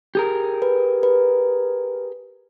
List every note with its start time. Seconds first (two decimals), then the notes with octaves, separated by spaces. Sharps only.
0.15 G4 G#4 A#4
0.62 B4
1.03 B4